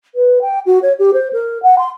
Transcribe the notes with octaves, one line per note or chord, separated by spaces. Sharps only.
B4
G5
F#4
C#5
G4
C5
A#4
F#5
C6